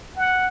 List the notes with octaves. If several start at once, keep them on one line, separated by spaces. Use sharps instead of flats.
F#5